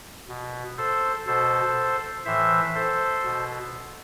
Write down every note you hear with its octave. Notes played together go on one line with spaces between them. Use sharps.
B2
A4 C5
B2 A4 C5
A2 E3 C5 E5
A4 C5
B2